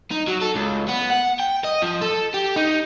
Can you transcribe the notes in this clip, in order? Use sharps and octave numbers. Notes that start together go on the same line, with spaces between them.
D#4
F#3
A4
C#2
B3
F#5
G5
D#5
F3
A4
G4
D#4